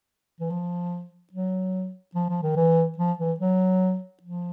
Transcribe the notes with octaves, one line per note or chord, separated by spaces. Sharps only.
E3
F3
F#3
F3
F3
D#3
E3
F3
E3
F#3
F3